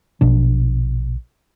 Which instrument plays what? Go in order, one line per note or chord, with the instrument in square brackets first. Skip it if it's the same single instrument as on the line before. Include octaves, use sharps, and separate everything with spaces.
[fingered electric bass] A#1 B2 D4